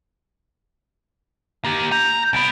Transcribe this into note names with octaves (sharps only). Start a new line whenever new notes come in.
A#3 G4
A#5 G6
C2 B3 D7